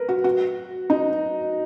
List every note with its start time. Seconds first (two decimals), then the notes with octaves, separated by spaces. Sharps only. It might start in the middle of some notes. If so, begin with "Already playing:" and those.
Already playing: A#4 B4
0.09 F#4
0.24 F#4
0.90 D#4